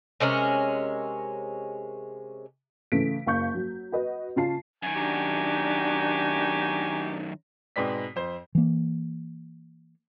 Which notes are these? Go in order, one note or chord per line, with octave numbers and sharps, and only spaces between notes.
C3 G#3 C#4 A#4
C#3 E3 A3 B6 D7
F#1 F5 C#6 G6
F#3
F#4 B4 D#5
C#3 C#4 F4 A5 C7
F#2 D#3 G#5
D4 D#4 F#4 G4
G#2 B2 B3 C4 D5 B6
F2 C5
E3 A#3